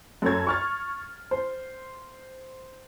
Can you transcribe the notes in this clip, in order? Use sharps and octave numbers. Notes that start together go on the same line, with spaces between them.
F#2 A4 C#5 G#6
C#6 F6 A6
C5